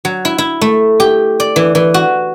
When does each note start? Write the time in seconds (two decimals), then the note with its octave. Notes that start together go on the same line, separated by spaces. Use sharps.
0.05 F#3
0.25 E4
0.38 E4
0.61 A3
1.00 G4
1.40 D5
1.56 E3
1.75 E3
1.94 F#4